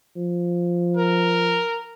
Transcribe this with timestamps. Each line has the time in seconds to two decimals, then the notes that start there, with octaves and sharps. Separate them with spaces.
0.16 F3
0.97 A#4